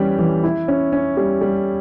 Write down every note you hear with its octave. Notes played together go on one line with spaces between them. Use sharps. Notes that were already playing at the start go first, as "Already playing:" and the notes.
Already playing: E3 G3 C#4 G4
E3
E4
C#4
C#4
G3
G3